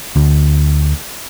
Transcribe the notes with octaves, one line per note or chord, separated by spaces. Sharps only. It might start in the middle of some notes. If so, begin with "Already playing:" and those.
D2